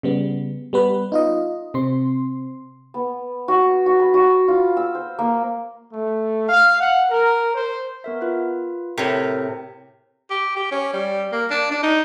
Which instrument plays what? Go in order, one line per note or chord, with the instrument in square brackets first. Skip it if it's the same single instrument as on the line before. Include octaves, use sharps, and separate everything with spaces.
[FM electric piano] C#3 G3 B3
G3 B3 B4
D#4 F4 D#5
C3 C4 C6
[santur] B3
F#4
F#4
B5
F#4
F4
E6
C5
A#3
[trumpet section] A3
F5
F#5
A#4
C5
[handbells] B3 A#4 E5
F4 B4
[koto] A2 C3 [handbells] A#4
[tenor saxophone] G4
G4
C#4
G3
A#3
D4
D4
D#4